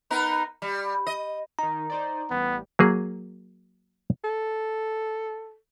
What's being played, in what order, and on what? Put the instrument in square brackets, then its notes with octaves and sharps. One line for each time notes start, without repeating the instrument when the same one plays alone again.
[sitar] B3 D#4 A#4
G3
D#5
[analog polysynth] D#3 D#4 [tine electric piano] A#5
[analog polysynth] D#4 C5 D5
[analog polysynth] A1 G3 [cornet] B3
[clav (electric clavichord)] F#3 A#3 G#4
[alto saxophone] A4